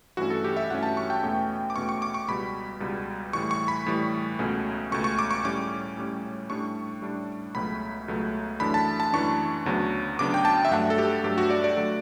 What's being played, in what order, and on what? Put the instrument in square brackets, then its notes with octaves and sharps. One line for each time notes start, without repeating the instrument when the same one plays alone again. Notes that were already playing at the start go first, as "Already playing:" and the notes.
[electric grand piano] G2 E3 A3 C#4 F#4
A4
G4
E5
G2 E3 A3 C#4 F#5
A5
C#6
G5
E2 B2 A3 C#4
D6
E2 B2 A3 C#4 C#6
C#6
D6
C#6
C#2 B2 G3 B5
C#2 B2 G3
A2 E3 G3 C#6
C#6
B5
A2 E3 G3
C#2 B2 A3 C#4
C#2 B2 A3 C#4 C#6
C#6
D6
C#6
A2 G3 C#4 D6
A2 G3 C#4
A2 G3 D4 C#6
A2 G3 D4
C#2 B2 F#3 A3 B5
C#2 B2 F#3 A3
F#2 E3 A3 D4 B5
A5
A5
F#2 E3 A3 D4 C#6
D2 C#3 F#3 B3 D4
D2 C#3 F#3 B3 D4 D6
G5
A5
E5
G2 F#3 A3 D4 F#5
A4
G4
G2 F#3 A3 D4 G4
F#4
D5
D5
D3 F#3 A3